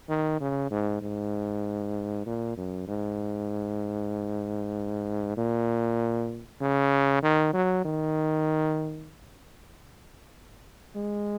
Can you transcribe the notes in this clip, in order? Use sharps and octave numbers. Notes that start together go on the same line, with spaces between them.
D#3
C#3
G#2
G#2
A#2
F#2
G#2
A#2
C#3
D#3
F#3
D#3
G#3